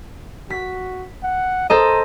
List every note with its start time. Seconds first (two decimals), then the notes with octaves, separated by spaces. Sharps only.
0.50 F#4 B6
1.23 F#5
1.70 A4 C5 D#5 A#5